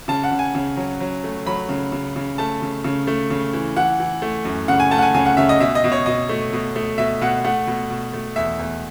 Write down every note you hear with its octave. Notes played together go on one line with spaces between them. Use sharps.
C#3 A5
F#5
C#3
G#5
C#3
F#3
F#3
A3
F#3 B5
C#3
C#3
C#3
A3 A5
C#3
C#3
A3
C#3
E3
E3 F#5
E3
A3
F#2
C#3 F#5
G#5
A3 A5
F#5
G#5
C#3 G#5
F#5
C#3 E5
D#5
B2 E5
D#5
B2
C#5
B2 D#5
A3
B2
A3
B2 E5
B2 F#5
A3 F#5
B2
B2
A3
E2 E5
E2